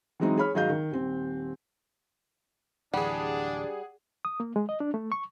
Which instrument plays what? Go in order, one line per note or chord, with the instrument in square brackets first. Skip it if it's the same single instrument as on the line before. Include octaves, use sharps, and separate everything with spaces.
[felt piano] E3 F#3 G#3 C4 D#4
G#4 C#5 B5 F6
G#1 F#3 G#4 D#5 F5 G6
D#3
D#1 C4
[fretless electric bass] D1 E3 [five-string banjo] G3 [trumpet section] D4 [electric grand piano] G#4 F#5
[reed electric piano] D#6
A#3
G#3
D#5
D4
A3
C#6